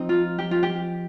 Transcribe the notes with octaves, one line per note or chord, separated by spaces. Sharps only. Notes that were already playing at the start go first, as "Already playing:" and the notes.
Already playing: F3 C4 D#4
F4
G4
F4
G4